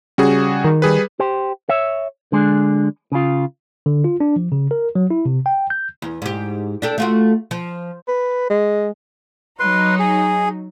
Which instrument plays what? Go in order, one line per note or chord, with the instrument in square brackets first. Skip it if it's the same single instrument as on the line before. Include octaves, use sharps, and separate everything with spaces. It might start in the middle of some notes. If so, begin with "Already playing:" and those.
[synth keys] C#3 [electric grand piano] G3 F#4 G#4
[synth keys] D#3
[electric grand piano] G3 G#4 B4
[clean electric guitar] G4 C5
C#5 E5
D3 G#3 D4 G#4
C#3 F4
[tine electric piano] D3
F4
D4
F3
C#3
A#4
F#3
E4
C3
G5
G6
[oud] E2
G#2 G4
D4 G4 A4
A3 F4 F#4
F3
[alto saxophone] B4
G#3
[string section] F#3 D#4 [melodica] B4 C6
[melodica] G#4